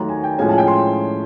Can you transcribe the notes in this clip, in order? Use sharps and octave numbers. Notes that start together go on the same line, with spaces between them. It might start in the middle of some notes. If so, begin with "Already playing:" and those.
Already playing: D#2 D#3 F#3 A3 A#5
G#5
G5
A2 F3 G#3 C#4 G#5
A5
G5
C6